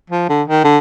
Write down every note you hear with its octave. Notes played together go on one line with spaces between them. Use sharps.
F3
D3
D#3
D3